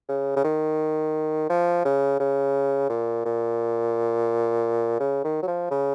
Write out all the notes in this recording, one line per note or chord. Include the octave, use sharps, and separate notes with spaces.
C#3
C#3
D#3
F3
C#3
C#3
A#2
A#2
C#3
D#3
F#3
F3
C#3